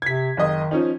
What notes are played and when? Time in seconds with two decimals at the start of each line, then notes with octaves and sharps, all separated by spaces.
0.02 C3 G#6 B6
0.37 F#1 D#3 D#5
0.71 F3 C#4 D#4